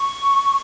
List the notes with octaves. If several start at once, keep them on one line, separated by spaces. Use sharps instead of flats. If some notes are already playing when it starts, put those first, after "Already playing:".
Already playing: C#6